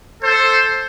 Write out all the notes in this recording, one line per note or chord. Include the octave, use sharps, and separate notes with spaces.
A4 C5